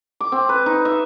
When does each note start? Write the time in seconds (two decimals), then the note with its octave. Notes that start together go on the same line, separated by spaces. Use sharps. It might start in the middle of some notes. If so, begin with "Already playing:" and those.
0.20 D6
0.32 C4
0.49 B4
0.66 D#4
0.85 E5